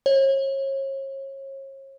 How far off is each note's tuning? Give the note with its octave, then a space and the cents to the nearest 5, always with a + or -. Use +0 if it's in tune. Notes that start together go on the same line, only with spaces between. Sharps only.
C#5 -35